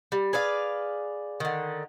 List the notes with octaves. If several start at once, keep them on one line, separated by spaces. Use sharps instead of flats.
G3
G#4 B4 D5 F5
D3 D#3